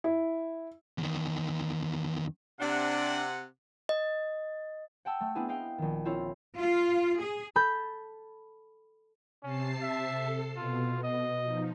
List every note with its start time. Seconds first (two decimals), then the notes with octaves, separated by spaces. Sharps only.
0.04 E4
0.98 E2 D#3
2.60 C3 D4 F#5
3.89 D#5
5.05 F#5 G5 A5 E6
5.21 A3
5.35 B3 C4 D4 E4 G#4
5.48 D#5 F5 G5
5.78 A#1 D#3
6.05 C4 E4 F4 C#5
6.57 F4
7.20 G#4
7.56 A4 B5 G6
9.43 C3 C#4 A5 C7
9.82 E5
10.13 A4
10.56 B2 F4
11.03 D#5
11.43 F3 D#4